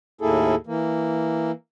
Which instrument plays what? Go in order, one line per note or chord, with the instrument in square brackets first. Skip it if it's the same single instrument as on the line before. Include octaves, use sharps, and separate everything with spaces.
[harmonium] D#2 A2 A#3 E4 G#4 A4
E3 A#3